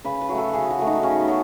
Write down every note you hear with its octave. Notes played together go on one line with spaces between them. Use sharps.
C#3 B4
B4
F#3 A3
A4
C#3 G#4
F#4
F#3 A3
D#4
C#3 C#4
B3
F#3